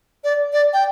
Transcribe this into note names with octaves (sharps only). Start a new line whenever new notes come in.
D5
D5
G5